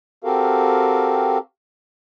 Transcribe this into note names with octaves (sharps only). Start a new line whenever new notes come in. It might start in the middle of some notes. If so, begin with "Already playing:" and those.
C4 F#4 G4 A4 A#4 F5